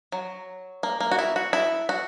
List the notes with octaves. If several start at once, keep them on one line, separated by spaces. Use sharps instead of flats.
F#3
A#3
A#3
F#4
E4
F#4
E4
F#4